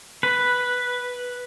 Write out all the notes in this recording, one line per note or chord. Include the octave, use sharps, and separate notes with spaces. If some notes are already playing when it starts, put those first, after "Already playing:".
B4